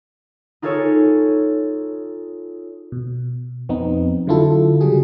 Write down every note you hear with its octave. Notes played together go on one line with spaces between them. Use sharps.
D#4 F4 G#4 A4 C#5
B2
F2 B3 C4 D#4
D3 F#3 E4 F4 A4
C#3 G3 F#4 G#4